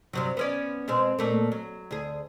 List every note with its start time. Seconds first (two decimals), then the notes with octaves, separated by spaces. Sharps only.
0.13 G2 C3 F#3
0.37 B3 C#4 D5
0.88 B2 G#3 C4
1.19 A#2 A3 A#3
1.52 F#3
1.91 D2 G#4